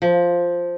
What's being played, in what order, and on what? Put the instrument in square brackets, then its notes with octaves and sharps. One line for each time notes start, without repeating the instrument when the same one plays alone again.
[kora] F3